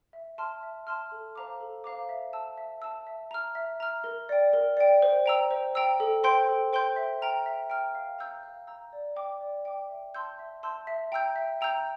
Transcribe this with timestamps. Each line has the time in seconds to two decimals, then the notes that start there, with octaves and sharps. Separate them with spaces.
0.13 E5
0.38 A5 C6 F6
0.63 E5
0.87 A5 C6 F6
1.12 A4
1.35 C5 F5 A#5 D6
1.60 A4
1.84 C5 F5 A#5 D6
2.09 E5
2.33 A5 E6
2.58 E5
2.82 A5 E6
3.07 E5
3.31 A#5 F6
3.55 E5
3.80 A#5 F6
4.04 A#4
4.29 D5 G5
4.53 A#4
4.77 D5 G5
5.02 C5
5.26 G5 A#5 E6
5.51 C5
5.75 G5 A#5 E6
6.00 A4
6.24 C5 G5 C6 G6
6.49 A4
6.73 C5 G5 C6 G6
6.96 E5
7.22 G5 A#5 F6
7.46 E5
7.70 G5 A#5 F6
7.95 F5
8.19 A#5 E6 G6
8.43 F5
8.67 A#5 E6 G6
8.93 D5
9.16 G5 D6
9.41 D5
9.65 G5 D6
9.89 E5
10.15 A5 C6 E6 G6
10.39 E5
10.63 A5 C6 E6 G6
10.87 E5
11.12 G5 A#5 E6 G6
11.36 E5
11.61 G5 A#5 E6 G6